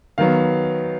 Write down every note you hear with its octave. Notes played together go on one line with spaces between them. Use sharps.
D#3 F#3 B3 F5